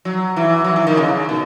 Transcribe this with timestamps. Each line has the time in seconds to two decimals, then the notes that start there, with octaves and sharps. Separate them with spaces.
0.05 F#3
0.36 E3
0.64 F#3
0.76 E3
0.87 D#3
0.97 C#3
1.29 B2